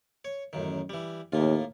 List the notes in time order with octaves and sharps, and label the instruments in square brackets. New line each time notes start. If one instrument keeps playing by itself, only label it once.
[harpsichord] C#5
A1 F#2 D#3
E3 G3
[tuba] D#2 [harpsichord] A2 A#3 F4